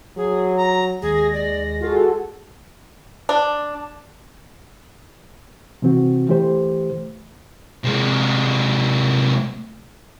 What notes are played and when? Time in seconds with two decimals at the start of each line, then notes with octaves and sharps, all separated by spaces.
0.17 F#3 G#4
0.57 A#5
1.02 D#2 G#3 G#4 A#6
1.33 D5
1.81 F4 F#4 G#4 A4
3.29 D4
5.82 C3 E3 C4 F#4
6.29 E3 A3 G4 C5
7.84 C3 G#3